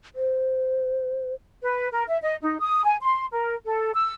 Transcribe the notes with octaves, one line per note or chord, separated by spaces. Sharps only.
C5
B4
A#4
E5
D#5
D#4
D#6
G#5
C6
A#4
A4
E6